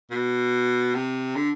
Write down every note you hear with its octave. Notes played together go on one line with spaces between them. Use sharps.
B2
C3
D3